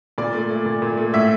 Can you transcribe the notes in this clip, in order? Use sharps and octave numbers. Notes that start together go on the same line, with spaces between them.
A#2 D5
A3
A3
A#2
A#2
A3
A2 E5